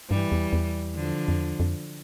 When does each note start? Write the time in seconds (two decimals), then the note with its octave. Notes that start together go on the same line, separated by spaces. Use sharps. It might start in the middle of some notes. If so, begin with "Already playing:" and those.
0.10 G2 E3 G3
0.32 E2
0.53 E2
0.95 D3 F3
1.28 F2
1.38 E2
1.60 F2